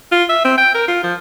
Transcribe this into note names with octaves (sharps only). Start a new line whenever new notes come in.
F4
E5
C4
G5
A#4
F4
F3